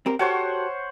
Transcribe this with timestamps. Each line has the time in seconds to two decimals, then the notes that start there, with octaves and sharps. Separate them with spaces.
0.06 C4 G4 A#4
0.19 F#4 G4 A4 C5 C#5 F#5